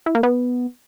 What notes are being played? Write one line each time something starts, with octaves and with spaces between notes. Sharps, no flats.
E4
A#3
B3